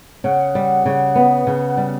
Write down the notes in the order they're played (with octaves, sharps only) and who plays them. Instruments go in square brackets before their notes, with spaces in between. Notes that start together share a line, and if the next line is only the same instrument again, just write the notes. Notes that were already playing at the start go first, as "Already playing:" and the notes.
[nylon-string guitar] C#3 [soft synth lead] F#5
[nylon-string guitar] G3
C#3
B3
C#3
G3